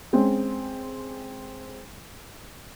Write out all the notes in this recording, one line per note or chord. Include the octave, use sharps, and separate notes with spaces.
G#3 C4 C#4